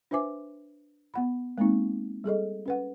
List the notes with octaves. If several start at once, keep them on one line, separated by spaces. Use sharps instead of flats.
D4 B4 C5 E5 G#5 D6
B3 F#5 B5
G#3 A#3 C4 D#4
G3 G#4 A4 D#5
C#4 B4 F#5